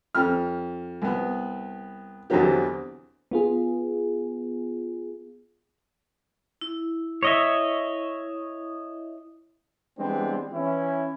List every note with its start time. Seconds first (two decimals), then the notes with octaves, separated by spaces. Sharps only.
0.15 F2 F6
1.02 C2 B3
2.30 E2 B2 D3 F#3 C4 G4
3.31 B3 F4 G#4
6.61 E4
7.23 C#5 D#5 E5
9.98 E3 G3 G#3 B3 C4 D4
10.52 E3 C#4 E4